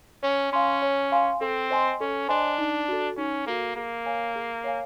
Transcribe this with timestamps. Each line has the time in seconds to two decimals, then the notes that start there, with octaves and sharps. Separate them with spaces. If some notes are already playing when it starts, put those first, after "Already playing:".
0.23 C#4 C#5
0.52 C#4 F5 G#5 C6
0.82 C#5
1.12 F5 G#5 C6
1.41 C4 A4
1.70 C5 D#5 G#5 C6
2.00 C#4 A4
2.29 D4 C5 D#5 G#5 C6
2.58 D#4
2.88 F#4 A4
3.17 C#4 D#4
3.46 A#3 F#4 A4
3.76 A#3 G#4
4.06 C#5 F5 G#5
4.36 G#4
4.64 C#5 F5 G#5